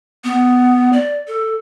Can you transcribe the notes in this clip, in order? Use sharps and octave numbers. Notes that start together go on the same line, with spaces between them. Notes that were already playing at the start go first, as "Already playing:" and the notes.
B3
D5
A4